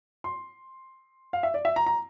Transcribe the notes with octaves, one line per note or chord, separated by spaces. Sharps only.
C6
F5
E5
D5
E5
A#5
A#5